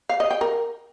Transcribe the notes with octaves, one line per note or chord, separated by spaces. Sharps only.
F5
D#5
G5
A#4